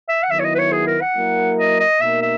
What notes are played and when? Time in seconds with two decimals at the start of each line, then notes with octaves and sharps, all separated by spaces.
0.09 E5
0.23 F#5
0.31 D#3 F#3 B3 E4 E5
0.40 C#5
0.44 D#5
0.55 B4
0.59 C#5
0.72 G#4
0.86 A#4
1.01 F#5
1.15 F#3 A#3 E4 A#4
1.57 D#5
1.80 D#5
2.00 B2 A#3 D#4 A#4 E5
2.22 E5